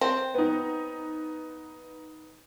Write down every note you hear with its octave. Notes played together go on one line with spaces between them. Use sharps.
C4
B3 D#4